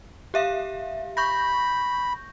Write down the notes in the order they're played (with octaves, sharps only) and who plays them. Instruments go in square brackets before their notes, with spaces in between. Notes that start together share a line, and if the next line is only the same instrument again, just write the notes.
[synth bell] G4 E5 F5
[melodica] B5 [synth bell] C#6 G6 A#6